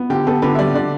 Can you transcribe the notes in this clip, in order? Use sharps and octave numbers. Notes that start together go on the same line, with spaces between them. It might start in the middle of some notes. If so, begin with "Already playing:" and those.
Already playing: B3
D3 G4
B3 A4
D3 B4
E5
G3 D5
D3 D5